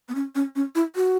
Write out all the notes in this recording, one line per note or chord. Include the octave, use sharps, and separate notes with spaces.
B3
C#4
C#4
C#4
E4
F#4